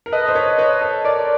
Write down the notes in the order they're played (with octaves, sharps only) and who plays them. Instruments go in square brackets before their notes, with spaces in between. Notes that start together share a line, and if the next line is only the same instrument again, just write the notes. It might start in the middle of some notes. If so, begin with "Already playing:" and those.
[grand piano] A#4
[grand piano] A4 B4 [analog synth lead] D#5
[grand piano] C5
B4 C#5
B4 C#5
A4
[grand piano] A#4 [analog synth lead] D5